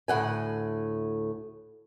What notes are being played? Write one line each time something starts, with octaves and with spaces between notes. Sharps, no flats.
D2 A2 F#5 G#5